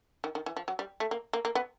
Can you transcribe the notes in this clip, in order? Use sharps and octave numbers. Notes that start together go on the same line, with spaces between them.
D#3
D#3
E3
F3
F#3
G3
A3
A#3
A#3
A#3
B3